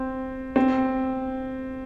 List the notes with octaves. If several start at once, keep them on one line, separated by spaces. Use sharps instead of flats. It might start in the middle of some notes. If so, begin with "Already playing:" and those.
Already playing: C4
C4